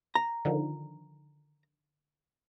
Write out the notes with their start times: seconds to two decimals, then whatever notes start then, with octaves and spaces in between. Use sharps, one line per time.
0.15 A#5
0.45 D3 D#3 F3